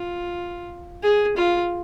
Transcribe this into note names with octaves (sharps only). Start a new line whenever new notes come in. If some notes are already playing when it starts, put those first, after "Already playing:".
Already playing: F4
G#4
F4